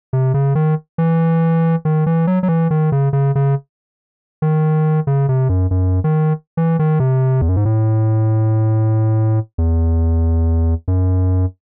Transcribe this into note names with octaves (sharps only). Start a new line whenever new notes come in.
C3
C#3
D#3
E3
D#3
E3
F#3
F#3
E3
D#3
C#3
C#3
C#3
D#3
C#3
C3
F#2
F#2
D#3
E3
D#3
C3
E2
F#2
G#2
A2
E2
F#2